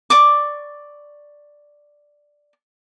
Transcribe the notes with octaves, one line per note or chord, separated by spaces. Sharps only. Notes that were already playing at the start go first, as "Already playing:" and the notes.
D5 C#6 D6